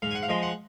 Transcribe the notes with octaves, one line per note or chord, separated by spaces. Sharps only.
G#2 F5
G#5
F#5
F5
F3 G#3 D#5
F#5